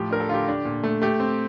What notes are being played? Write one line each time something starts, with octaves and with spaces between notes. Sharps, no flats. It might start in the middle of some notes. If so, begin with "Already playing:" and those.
Already playing: A2 F3 G4
D4 A#4
A4
D3 F4 G4
D4
A#2
A3
A3 G4
C4